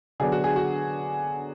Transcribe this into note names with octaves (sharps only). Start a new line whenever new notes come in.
D3 F#3 B3 D4 G#4
F#4
G#4
F#4